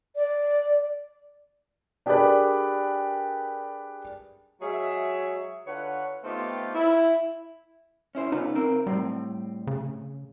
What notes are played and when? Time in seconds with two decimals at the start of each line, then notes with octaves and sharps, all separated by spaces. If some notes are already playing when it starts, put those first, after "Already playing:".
0.16 D5
2.06 D4 G4 G#4 A#4 B4 D5
4.61 F#3 G#3 G#4 C#5 E5
5.67 D3 F4 B4 C#5 F#5
6.24 A3 B3 C4 D#4 F4 G4
6.75 E4
8.15 C#4 E4 C5
8.32 C#3 B3 D#4 F4
8.55 C4 A#4
8.87 A2 G3 C4
9.67 C#3